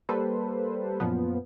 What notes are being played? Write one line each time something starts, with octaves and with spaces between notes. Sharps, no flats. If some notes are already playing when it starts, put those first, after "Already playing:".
G3 A#3 A4 B4 C5
F#2 A#2 F3 B3